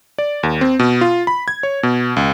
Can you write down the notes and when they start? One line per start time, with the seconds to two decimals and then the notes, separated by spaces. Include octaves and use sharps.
0.18 D5
0.43 D#2
0.61 C4
0.79 B2
1.01 F4
1.27 B5
1.48 G#6
1.63 C#5
1.83 B2
2.16 C#2